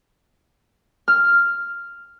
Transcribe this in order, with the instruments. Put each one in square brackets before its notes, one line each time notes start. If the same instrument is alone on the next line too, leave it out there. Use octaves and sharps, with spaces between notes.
[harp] F6